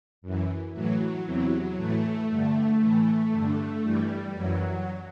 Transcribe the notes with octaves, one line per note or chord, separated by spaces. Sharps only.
F#2 E3
A2 E3 F#3
E2 C3 E3 F#3
A2 E3 A3
G2 D3 A3
A2 E3
G2 D3
G2 E3 G3
F#2 E3 F#3